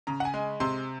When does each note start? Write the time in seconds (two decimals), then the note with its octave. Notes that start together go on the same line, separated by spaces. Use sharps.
0.07 C#3 A#5
0.20 F#5
0.25 G#5
0.34 G#3
0.60 C3 C6